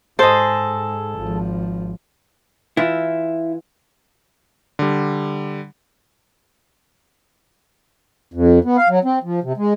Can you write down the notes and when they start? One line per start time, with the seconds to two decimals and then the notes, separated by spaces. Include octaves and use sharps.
0.19 G#2 G#4 A4 C5 D#5
1.16 G#1 F3
2.77 E3 E4 F4
4.79 D3 G3
8.34 F2
8.65 B3
8.77 F5
8.89 F#3
9.04 C4
9.24 F3
9.43 C3
9.57 G#3